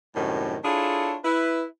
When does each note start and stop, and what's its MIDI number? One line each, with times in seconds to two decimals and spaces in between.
0.16 0.57 42
0.16 0.57 45
0.16 0.57 48
0.16 0.57 51
0.16 0.57 55
0.64 1.16 62
0.64 1.16 64
0.64 1.16 65
0.64 1.16 68
0.64 1.16 69
0.64 1.16 73
1.25 1.64 64
1.25 1.64 71